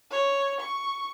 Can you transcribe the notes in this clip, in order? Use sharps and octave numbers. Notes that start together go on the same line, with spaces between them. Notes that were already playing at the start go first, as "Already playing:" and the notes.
C#5
C#6